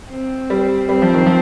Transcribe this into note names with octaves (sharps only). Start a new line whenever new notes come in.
C4
G3
G3 C4
F3
D#3
F3